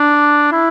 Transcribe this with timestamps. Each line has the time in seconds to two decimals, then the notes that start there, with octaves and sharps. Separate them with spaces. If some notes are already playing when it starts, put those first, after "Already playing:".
Already playing: D4
0.52 E4